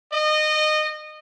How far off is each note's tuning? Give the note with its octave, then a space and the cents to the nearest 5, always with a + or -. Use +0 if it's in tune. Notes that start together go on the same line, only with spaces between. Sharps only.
D#5 -25